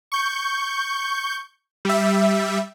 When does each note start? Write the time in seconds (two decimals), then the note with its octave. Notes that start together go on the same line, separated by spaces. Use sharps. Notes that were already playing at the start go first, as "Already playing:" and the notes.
0.12 C#6 G6
1.85 G3 E5